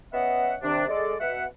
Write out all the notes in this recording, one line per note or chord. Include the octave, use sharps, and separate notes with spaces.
B3 C#4 D#5 E5 F#5
C3 D#3 D4
G#3 A4 D5
B2 E5 F#5